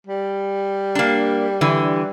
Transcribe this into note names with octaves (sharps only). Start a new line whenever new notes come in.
G3
A#3 D4
D3 E3